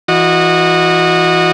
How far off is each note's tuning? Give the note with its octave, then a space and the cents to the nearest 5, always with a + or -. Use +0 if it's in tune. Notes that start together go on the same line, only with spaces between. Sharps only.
E3 +0 F#4 -20 D#5 -25